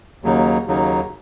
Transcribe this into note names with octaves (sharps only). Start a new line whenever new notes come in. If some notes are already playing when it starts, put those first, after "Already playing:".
D#2 C#3 F#3 A#3 D#4
D#2 C#3 F#3 A#3 D#4